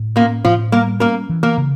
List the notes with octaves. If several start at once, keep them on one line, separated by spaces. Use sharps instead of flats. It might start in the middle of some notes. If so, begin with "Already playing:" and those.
Already playing: A2
A#2 A#3 C#4
A2 F3 F4
G3 A#3 A#4
A#3 C#4 A#4
E3
A#3 A#4
C#3